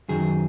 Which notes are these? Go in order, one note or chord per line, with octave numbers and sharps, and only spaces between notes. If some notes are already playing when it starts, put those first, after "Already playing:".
F#2 D#3 F#3 G#4